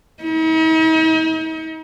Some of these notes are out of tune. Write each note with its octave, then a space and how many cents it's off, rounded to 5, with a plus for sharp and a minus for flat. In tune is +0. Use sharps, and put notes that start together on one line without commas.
D#4 +45